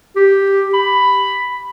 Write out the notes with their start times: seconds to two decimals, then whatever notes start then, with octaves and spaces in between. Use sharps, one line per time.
0.16 G4
0.73 B5